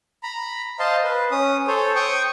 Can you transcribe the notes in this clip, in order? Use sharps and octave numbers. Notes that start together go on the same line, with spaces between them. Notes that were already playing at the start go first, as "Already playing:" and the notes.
A#5 B5
C5 D#5 F5 A5 C6
B4
C#4 D#6
A4 C5 C#5
G5 C#6 D#6